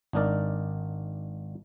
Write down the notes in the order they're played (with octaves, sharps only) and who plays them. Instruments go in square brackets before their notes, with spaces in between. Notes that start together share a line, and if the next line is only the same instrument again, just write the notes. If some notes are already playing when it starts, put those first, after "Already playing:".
[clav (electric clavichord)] G#1 D4 D#4 A#4 D5